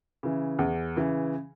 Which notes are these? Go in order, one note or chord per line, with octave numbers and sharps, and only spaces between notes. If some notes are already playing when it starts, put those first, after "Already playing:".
C#3 E3
E2
C#3 E3